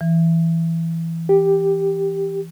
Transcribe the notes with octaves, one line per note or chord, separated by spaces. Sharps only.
E3
G4